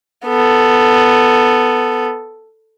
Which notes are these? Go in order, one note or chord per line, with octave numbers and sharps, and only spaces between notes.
B3 A4